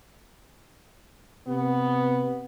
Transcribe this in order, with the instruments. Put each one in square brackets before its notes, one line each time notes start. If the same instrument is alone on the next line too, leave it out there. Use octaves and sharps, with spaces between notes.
[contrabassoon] C3 [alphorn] B3